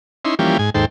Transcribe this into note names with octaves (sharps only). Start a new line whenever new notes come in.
C#4 D#4 E4 C6
E3 F3 G3 A#3 C#4 G4
G#2 G#5
D#2 G#2 A4 C5 G5